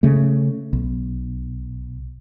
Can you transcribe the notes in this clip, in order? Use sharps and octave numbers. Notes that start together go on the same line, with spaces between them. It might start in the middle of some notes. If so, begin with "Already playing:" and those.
C#3 A3
B1